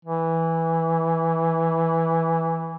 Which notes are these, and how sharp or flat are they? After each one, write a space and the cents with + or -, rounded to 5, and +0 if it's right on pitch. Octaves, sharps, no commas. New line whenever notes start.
E3 -5